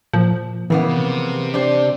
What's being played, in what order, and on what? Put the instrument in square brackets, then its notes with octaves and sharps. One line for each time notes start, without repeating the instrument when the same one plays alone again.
[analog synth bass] A#2 [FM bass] F3
[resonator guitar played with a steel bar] C#3 A#3 B3 [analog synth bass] E3
[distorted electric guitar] C3
[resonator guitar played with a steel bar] D4 G4 C5